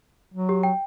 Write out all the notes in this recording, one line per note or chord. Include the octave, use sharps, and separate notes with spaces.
F#3
G4
G5